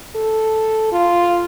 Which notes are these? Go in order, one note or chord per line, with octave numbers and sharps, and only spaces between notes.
A4
F4